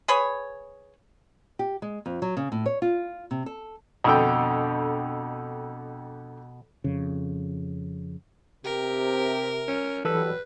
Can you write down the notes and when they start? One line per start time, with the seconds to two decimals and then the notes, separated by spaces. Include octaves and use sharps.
0.08 G#4 B4 C#5
1.59 G4
1.82 G#3
2.06 F2
2.22 F#3
2.37 C#3
2.52 A2
2.66 C#5
2.82 F4
3.31 C3
3.46 A4
4.04 F2 B2 D3 G5
6.84 F2 C#3
8.65 C3 G4 A#4
9.68 C#4
10.05 E3 F#3 G3 A4 B4 E6